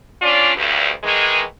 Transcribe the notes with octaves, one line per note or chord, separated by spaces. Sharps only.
C#4 D4 F4 D5
D2 G2
D#3 E3 G#3